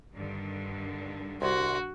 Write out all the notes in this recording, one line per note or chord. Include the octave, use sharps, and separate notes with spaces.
G2 D3 D#3
C2 F#4 C6